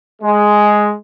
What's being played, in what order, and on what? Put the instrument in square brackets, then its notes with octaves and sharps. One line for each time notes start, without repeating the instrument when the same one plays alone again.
[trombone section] G#3